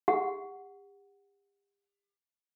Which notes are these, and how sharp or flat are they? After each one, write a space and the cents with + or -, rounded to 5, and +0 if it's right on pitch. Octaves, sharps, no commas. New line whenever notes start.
G4 +40 F#5 +0